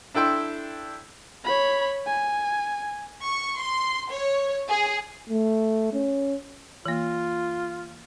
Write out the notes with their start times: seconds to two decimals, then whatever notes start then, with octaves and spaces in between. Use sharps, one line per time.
0.14 D4 E4 A4 G5 C6 E6
1.44 C#5 B5
2.06 G#5
3.25 C#6
3.62 C6
4.11 C#5
4.67 G#4
5.30 A3
5.93 C#4
6.86 E3 A#3 F4